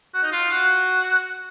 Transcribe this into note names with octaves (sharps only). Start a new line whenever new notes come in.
F#4
D#4
F4
F#4